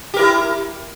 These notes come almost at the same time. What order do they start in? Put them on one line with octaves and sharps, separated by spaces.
G4 A#4 E4